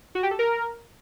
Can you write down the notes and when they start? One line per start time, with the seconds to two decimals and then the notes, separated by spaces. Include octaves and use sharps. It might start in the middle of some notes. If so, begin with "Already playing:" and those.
0.15 F#4
0.23 G4
0.31 A4
0.39 A#4